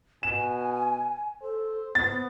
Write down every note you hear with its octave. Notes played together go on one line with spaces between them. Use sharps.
B2 G#5 E7
A4 C5
B3 A6